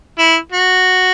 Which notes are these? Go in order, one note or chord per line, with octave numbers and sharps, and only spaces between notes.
E4
F#4